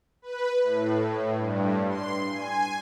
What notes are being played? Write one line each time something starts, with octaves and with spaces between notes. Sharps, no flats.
B4
A2
G2
C6
G#5